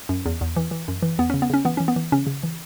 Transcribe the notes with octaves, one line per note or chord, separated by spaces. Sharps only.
F#2
E2
E2
E3
E3
F#2
E3
E2 B3
C#3 C#4
B3
C#3 C#4
E3 B3
E3 C#4
B3
E3
C#3 C#4
C#3
E3